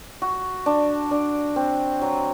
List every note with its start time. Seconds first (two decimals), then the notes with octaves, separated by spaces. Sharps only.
0.22 F#4
0.66 D4
1.11 D4
1.56 C4
2.01 F#3